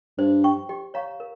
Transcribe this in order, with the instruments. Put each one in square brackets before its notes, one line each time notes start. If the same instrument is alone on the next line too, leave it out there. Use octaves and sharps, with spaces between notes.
[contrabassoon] G2 [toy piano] C5
[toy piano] G5 C#6
G4
C#5 F5 A#5 C#6
A#4